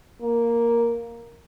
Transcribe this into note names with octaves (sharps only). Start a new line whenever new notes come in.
A#3